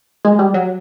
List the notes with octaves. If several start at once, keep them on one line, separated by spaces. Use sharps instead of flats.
G#3
G3
F#3